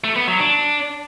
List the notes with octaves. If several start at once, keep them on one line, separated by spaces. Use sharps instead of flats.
A3
B3
F#3
D4